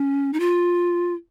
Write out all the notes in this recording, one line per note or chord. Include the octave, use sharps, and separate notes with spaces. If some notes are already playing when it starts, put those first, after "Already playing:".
Already playing: C#4
D#4
F4